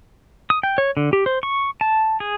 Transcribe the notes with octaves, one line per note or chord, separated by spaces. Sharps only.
D#6
G5
C#5
D3
G4
C5
C#6
A5
G#4